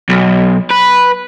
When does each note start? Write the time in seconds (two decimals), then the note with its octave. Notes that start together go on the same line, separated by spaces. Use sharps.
0.09 B1
0.70 B4